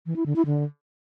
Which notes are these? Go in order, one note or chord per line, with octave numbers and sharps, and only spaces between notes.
E3
E4
D3
E4
D3